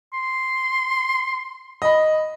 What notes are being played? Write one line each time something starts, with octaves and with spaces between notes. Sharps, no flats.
C6
D#5 B5